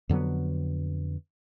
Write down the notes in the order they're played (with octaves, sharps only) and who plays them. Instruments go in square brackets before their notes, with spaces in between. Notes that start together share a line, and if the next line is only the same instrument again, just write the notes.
[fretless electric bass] F2 D3 F#3 B3